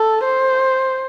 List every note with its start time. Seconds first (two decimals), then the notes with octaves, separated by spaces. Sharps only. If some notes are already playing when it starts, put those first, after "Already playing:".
Already playing: A4
0.24 C5